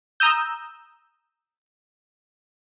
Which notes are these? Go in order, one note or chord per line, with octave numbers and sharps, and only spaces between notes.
A#5 D#6 E6 G6